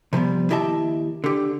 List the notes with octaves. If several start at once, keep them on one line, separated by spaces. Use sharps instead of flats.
C3 F3 G3 B3
D#2 E4 G4 D#5 E5 A5
D3 G4